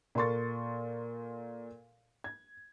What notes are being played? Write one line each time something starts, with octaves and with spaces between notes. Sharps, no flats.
A#2 A4 A#4 C6 C#6 A6
G#6